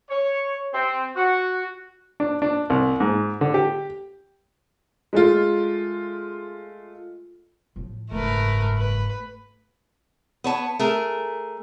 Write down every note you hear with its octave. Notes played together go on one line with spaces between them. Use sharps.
C#5
C4
F#4
D4
D4
C2
G#2
D3
G4
G#3 A3 F4
A2 F3
F#1 G#2 A3 A#4 B4
B4
B3 C#5 A5
A3 G#4 A#4